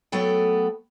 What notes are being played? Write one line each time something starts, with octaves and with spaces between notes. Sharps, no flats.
F#3 A3 B3 A4 G5